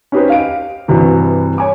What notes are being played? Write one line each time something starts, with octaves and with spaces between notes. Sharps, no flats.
C#4 D#4 G4 B4 C5
F5 D7
G2 C3 E3 F#4
C#5 G#5 D6